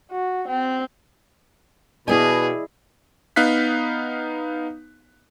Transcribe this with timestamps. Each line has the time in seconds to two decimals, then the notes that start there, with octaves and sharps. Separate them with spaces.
0.11 F#4
0.48 C4
2.08 B2 B3 E4 G#4 D5 D#5 G#5
3.36 B3 D#4 F5 F#6 B6